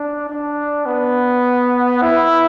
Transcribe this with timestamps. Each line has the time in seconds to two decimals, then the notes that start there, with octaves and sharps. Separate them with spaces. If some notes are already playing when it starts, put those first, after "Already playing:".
Already playing: D4
0.30 D4
0.86 B3
2.02 E4